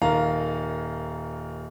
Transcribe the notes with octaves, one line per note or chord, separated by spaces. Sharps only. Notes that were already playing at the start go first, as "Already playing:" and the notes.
D#1 D#3 F5 A#5